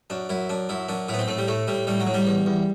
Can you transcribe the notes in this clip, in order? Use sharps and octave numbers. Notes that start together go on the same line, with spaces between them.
F#2 D4
F#2 E4
F#2 D4
F#2 E4
F#2 D4
A2 E4
B3
C4
A2 A3
G3
A2 A3
A2 G3
A2 G3
F#3
A2
G3
E2
E2